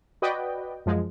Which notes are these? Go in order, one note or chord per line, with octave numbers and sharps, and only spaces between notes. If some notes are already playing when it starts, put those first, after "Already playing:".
F#4 B4 D5 D#5 G5
F#2 F3 G#3